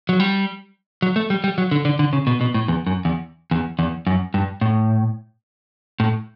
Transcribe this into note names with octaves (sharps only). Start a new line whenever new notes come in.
F#3
G3
F#3
A3
G3
G3
F#3
D3
D3
D3
C#3
B2
B2
A2
E2
F#2
E2
E2
E2
F#2
G2
A2
A2